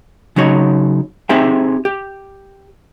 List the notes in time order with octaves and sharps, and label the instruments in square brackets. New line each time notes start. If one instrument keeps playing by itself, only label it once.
[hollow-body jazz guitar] C#3 F#3 D#4 C#5
C4 D#4 G4 G#4 E5 G5
G4